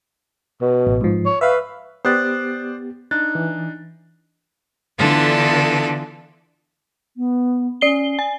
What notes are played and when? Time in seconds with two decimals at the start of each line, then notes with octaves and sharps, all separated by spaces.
0.61 B2
0.87 A1
1.01 G#2 F3
1.26 C#5
1.41 B4 E5 F5
2.05 B3 G4 C5 D5 D#6 F#6 A6
3.11 D4 D#4 F#6 A6
3.35 E3
4.99 D3 E3 B3 D4 F4 A4
7.17 B3
7.81 C#4 D5 C7 G7
8.19 G#5